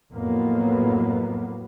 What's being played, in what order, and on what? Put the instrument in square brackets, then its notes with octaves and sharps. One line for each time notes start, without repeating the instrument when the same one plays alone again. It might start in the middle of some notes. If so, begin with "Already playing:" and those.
[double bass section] F2 A2 F#3 A#3 B3